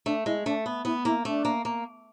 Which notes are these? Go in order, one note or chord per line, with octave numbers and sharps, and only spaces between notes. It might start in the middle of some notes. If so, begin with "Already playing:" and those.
A3 D4
G#3 E4
A3 D4
B3
B3 E4
A#3 E4
A3 D4
A#3
A#3